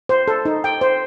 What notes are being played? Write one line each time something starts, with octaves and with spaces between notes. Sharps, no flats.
C5
A4
D#4
G5
C5